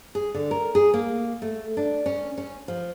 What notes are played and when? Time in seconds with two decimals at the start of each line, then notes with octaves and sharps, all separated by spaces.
0.15 G#4
0.34 D3
0.51 A#4
0.75 G#4
0.94 A#3
1.42 A3
1.77 D4
2.06 C#4
2.38 C#4
2.68 F3